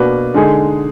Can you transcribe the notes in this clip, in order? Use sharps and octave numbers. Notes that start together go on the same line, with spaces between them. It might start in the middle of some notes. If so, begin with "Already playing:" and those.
Already playing: B2 A#3 D4 F#4 B4
D3 G#3 D#4 G#4